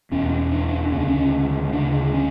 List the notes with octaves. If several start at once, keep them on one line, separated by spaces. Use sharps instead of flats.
E2 B2 C#4
D4
D4
D2 C#3 C#4
D4
C#4
D2 C#3 D4
C#4